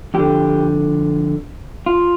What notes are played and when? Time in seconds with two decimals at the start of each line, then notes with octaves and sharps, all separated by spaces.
0.14 F2 D3 G4
1.86 F4